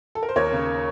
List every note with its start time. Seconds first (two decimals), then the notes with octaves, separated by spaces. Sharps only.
0.15 A4
0.23 A#4
0.29 C5
0.36 D#2 A#4 C#5
0.53 C#3